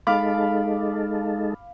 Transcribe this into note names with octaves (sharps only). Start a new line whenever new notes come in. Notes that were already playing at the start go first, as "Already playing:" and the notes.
G#3 D#4 A4 F5 B5 D6